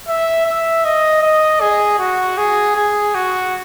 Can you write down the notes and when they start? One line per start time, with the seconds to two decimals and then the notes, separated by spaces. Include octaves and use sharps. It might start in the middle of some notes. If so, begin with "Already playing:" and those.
0.08 E5
0.45 E5
0.85 D#5
1.22 D#5
1.61 G#4
1.99 F#4
2.37 G#4
2.76 G#4
3.15 F#4